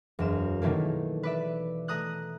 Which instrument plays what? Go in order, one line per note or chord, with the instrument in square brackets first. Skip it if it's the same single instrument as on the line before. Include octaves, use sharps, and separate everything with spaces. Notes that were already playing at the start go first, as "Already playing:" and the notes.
[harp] E1 F#2 E7
B2 D#3 E3 A3 A#3
B4 D5 E5
A3 A#5 D#6 F#6